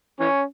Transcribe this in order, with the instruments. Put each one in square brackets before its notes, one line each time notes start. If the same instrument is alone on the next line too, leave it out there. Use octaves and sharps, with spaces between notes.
[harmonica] E3 C#4